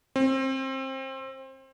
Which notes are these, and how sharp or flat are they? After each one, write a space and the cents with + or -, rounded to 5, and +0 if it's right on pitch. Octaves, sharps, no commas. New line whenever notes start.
C4 +25